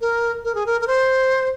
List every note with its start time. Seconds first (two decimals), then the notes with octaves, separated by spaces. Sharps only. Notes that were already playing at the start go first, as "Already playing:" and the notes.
0.01 A#4
0.44 A#4
0.55 G#4
0.66 A#4
0.81 A#4
0.87 C5